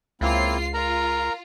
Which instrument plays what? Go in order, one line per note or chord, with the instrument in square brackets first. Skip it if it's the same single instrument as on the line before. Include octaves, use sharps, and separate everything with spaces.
[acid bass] C#2 [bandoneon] A#3 C4 E4 [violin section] F4 C7
[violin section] F4 [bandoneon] A#4 A#5